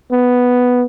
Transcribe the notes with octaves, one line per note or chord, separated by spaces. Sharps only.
B3